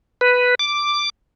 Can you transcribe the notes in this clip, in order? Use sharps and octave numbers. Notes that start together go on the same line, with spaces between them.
B4
D6